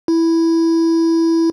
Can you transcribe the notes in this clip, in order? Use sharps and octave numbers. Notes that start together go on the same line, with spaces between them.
E4